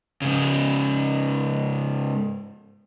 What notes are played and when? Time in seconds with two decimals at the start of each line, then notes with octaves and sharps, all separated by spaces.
0.22 G#2 C#3